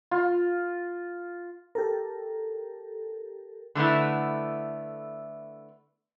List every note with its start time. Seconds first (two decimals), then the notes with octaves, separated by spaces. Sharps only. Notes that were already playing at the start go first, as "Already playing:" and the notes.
0.11 F4
1.75 G4 A4 A#4
3.75 D3 A3 B3 E4